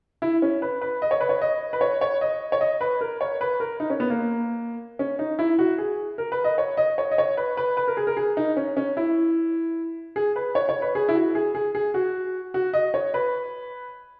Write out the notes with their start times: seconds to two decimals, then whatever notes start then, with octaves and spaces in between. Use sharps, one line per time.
0.22 E4
0.42 C#4
0.62 B4
0.81 B4
1.02 D#5
1.11 C#5
1.20 B4
1.29 C#5
1.42 D#5
1.73 B4
1.81 C#5
2.01 C#5
2.21 D#5
2.52 C#5
2.61 D#5
2.81 B4
3.01 A#4
3.21 C#5
3.41 B4
3.60 A#4
3.80 D#4
3.90 C#4
4.00 B3
4.10 A#3
4.99 C#4
5.19 D#4
5.39 E4
5.59 F#4
5.78 G#4
6.18 A#4
6.32 B4
6.44 D#5
6.58 C#5
6.77 D#5
6.98 C#5
7.11 D#5
7.18 C#5
7.37 B4
7.57 B4
7.77 B4
7.88 A#4
7.97 G#4
8.07 A#4
8.17 G#4
8.37 D#4
8.57 C#4
8.77 C#4
8.97 E4
10.16 G#4
10.36 B4
10.55 C#5
10.69 C#5
10.82 B4
10.95 G#4
11.09 E4
11.15 F#4
11.35 G#4
11.55 G#4
11.75 G#4
11.94 F#4
12.54 F#4
12.73 D#5
12.94 C#5
13.14 B4